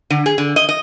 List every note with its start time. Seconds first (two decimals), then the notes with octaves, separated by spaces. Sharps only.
0.10 D3
0.26 G#4
0.38 D3
0.56 D#5
0.69 D#5